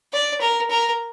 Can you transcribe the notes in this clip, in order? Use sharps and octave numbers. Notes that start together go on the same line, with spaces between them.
D5
A#4
A#4